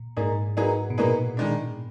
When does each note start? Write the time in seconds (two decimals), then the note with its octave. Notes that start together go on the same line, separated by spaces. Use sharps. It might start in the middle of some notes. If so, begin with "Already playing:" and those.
Already playing: A#2
0.17 G#2 A#3 D#4 G#4
0.57 F#3 A#3 D#4 G#4 B4
0.90 B2
0.98 A#2 F#3 A#3 D#4 G#4 B4
1.37 D#3 G#3 D4